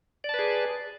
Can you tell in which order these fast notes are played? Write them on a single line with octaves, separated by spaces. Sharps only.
D5 A5 B4 G#4